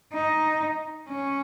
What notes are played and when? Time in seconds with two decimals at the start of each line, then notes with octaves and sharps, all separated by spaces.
0.13 D#4
1.09 C#4